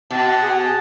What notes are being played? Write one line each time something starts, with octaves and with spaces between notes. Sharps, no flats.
B2 A5
F#5
G#4
A5